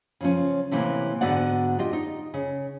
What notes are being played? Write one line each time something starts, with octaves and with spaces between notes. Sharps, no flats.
C#3 F3 C#4
A2 C3 E3 A#3
G#2 D3 B3 F#4 D5 F#5
F4 G4 D#5
D#4
C#3